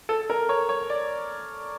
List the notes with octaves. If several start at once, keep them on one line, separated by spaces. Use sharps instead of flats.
A4
A#4
C#5
C#5
D5